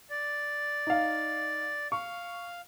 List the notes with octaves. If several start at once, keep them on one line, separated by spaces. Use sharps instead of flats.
D5
D#4 F5
F5 C#6